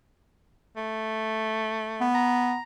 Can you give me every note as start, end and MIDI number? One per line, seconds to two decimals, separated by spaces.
0.76 2.06 57
2.01 2.56 59
2.15 2.63 82